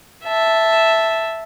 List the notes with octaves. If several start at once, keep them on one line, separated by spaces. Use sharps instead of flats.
E5 A5